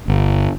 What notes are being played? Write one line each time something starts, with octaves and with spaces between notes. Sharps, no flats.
G1